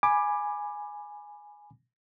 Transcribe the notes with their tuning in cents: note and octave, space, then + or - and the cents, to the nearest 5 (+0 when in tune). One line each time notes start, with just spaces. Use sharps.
G#5 +0 B5 -5 D6 +15